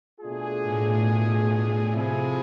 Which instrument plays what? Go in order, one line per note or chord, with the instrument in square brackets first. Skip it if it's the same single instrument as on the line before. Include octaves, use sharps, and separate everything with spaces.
[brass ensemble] B2 A3 D4 F4 G#4
[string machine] A2
A2
[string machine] C3 [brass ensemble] F3 A3 E4 G#4